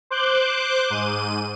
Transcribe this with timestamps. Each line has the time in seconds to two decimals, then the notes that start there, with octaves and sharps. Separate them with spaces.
0.10 C5 D6 F#6 G6
0.90 G#2 D#7